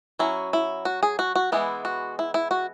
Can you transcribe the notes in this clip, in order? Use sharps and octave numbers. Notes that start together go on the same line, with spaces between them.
F#3 C#4 E4
E4
F#4
G#4
F#4
F#4
E3 G#3 B3 E4
F#4
E4
E4
F#4